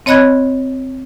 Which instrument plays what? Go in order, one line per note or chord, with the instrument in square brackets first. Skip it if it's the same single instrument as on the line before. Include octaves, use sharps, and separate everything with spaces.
[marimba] C4 C#5 D#5 B5 F#6 G#6